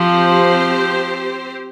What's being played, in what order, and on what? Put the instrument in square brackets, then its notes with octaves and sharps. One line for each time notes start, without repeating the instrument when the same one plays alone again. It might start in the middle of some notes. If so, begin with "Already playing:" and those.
Already playing: [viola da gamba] F3 [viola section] C4 G4 C5